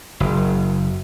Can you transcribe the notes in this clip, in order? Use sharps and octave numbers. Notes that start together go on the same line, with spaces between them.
F#1